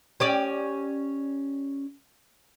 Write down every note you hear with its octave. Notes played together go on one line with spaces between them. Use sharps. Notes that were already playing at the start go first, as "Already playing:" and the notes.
C#4 G4 D5